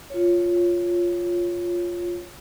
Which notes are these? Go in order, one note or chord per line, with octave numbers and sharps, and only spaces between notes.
F4 C#5